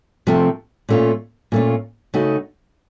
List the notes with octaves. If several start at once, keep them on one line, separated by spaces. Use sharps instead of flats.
C3 F3 A3 C4
A#2 A3 C#4 F4
A#2 A3 C#4 F4
C#3 A3 D#4 F#4